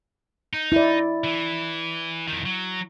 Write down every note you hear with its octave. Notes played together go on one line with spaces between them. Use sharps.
D#4
E4 D5
E3
F2 D#3
F#3